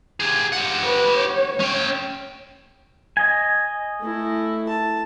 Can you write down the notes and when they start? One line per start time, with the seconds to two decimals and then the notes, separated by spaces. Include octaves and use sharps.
0.20 G4 G#4
0.53 G4 F#5
0.82 B4
1.18 C#5
1.60 C#4 G5
3.17 D#5 G#5
4.01 A3 E4
4.69 A5